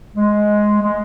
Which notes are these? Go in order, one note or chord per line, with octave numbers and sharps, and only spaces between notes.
G#3
G#3